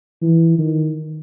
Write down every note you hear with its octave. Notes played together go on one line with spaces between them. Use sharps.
E3
D#3